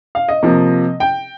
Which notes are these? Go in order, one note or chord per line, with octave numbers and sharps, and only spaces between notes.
F5
D#5
C3 F3 A#3
G5